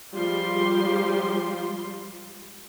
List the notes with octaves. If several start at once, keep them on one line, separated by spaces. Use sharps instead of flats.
F3 G3 G#3 F4 G4 C6